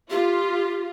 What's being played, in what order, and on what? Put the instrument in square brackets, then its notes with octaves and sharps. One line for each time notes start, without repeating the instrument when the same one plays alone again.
[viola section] F4 [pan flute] G4